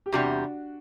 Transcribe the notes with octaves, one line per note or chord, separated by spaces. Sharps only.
G4
E2 C3 G3 D4 F#4